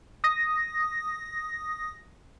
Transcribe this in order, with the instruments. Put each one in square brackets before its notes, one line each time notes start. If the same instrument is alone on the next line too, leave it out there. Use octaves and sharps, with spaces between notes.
[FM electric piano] D#6 A#6